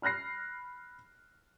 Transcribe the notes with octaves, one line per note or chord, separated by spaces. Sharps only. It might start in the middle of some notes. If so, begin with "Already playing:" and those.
B5 F6 F#6 A#6 C7